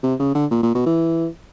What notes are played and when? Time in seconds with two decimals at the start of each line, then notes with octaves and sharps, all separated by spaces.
0.03 C3
0.19 C#3
0.35 D3
0.51 A#2
0.63 A#2
0.75 B2
0.86 E3